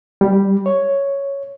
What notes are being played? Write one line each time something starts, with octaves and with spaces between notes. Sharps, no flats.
G3
C#5